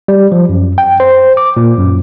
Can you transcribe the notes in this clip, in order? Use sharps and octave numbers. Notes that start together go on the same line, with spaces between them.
G3
F3
F#2
G5
C5
D6
A#2
F#2